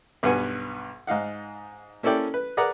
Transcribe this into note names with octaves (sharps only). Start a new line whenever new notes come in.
B1 G2 B3 B4 F#5 G#5
G#2 D#4 F5 F#5
A#3 C#4 E4 A4 D5 G5
B4
G#4 A#4 B4 D5 F#5 A#5